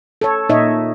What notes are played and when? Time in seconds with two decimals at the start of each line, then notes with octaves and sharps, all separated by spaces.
0.21 A4 C#5
0.49 A#2 D#4 C#5 D#5 E5